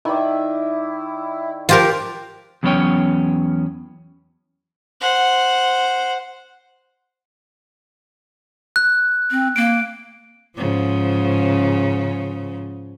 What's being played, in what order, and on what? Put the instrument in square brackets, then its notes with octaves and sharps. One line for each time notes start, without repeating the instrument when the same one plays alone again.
[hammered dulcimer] D#3 D5 [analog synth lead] E4
[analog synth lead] F3 [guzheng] F4 G4 A#4 [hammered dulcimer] F#5 C6
[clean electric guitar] E2 F#3 B3 C#4 C#5 G5
[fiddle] C5 F#5
[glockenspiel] F#6
[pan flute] C4
[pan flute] A#3 [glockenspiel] D7
[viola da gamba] G#2 C#3 F3